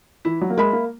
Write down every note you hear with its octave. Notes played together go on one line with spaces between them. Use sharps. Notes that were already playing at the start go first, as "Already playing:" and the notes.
E3 E4
F#3
A#3
G#3 A#4 E5 B5
A#3